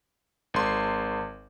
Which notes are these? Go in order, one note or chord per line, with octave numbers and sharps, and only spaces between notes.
G#1 C6